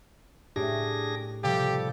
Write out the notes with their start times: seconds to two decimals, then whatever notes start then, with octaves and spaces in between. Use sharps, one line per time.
0.56 A2 D4 G4 G#4 C#5 A#6
1.44 C3 F3 G3 G4 A4 F5